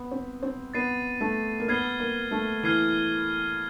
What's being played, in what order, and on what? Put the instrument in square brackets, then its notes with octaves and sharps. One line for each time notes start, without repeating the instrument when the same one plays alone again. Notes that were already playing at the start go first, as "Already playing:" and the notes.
Already playing: [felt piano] B3
C4
C4
[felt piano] B3 [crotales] A6 C7 D#7
[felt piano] A3
A#3
[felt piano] B3 [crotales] F6 G#6 C7 D#7 G7
[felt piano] A#3
A3
[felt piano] E3 [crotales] F6 G#6 C7 D#7 G7